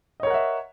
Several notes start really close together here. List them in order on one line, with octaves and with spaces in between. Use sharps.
D#5 C#5 A#4 F#5 E5